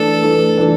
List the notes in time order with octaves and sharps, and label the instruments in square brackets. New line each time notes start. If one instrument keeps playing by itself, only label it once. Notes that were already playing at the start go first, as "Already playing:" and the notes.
Already playing: [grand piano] E3 A3 D4 [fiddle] A4
[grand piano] E3 A3 D4
E3 A3 D4